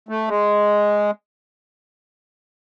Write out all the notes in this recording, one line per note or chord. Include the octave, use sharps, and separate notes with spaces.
A3
G#3